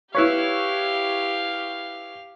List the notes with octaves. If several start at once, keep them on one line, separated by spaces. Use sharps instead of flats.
E4 G4 B4 C#5 F5